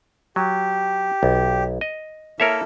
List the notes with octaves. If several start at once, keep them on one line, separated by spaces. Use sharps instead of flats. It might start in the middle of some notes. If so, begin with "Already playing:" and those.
F#3 G4
B1
D#5
A#3 E4 A4 A#4 C#5 E5